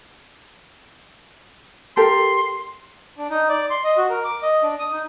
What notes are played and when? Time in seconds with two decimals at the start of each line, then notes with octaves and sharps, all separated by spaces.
1.97 G4 A4 A#4 C6
3.18 D4
3.30 D#4
3.49 D5
3.70 C6
3.84 D#5
3.97 F#4
4.09 A#4
4.25 D6
4.43 D#5
4.63 D4
4.79 D#6
4.92 D#4